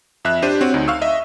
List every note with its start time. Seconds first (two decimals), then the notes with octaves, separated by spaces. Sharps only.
0.25 F2 E5 F#6
0.42 D4 G4 C5 D#7
0.61 C4 F#4 C#5
0.74 D2 D#4
0.88 F5 C#6 E6
1.02 D#5 E5